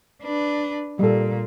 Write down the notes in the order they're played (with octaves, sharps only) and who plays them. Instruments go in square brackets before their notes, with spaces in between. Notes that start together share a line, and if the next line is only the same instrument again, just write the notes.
[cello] D4 B4
[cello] A#2 [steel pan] G3 A4